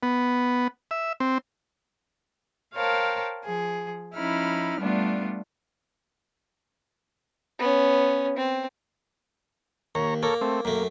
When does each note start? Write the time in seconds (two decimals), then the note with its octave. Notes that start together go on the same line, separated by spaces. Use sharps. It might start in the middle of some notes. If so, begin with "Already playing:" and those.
0.03 B3
0.91 E5
1.20 C4
2.74 A#4 C5 C#5 F5 G5 A5
3.43 F3 G#4
4.14 F3 C#4 D#4 E4 B5 F6
4.77 G3 A3 B3 D4 F4
7.59 B3 C#4
8.37 C4
9.95 D#2 C#5 A#5
10.23 A#3 A4 A#4 C#5
10.41 A3 C4
10.65 F#2 A3 A#3